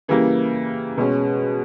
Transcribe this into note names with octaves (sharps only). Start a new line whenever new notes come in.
C#3 E3 G3 A#3
B2 G#3 C#4